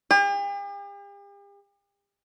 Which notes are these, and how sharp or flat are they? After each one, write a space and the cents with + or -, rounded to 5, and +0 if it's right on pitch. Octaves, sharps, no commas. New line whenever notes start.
G4 +45